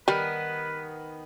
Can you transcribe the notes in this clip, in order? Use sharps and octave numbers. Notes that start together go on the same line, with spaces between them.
D#3 G3 B3 B4